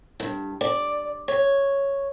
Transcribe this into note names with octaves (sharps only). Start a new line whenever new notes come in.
G2
D5
C#5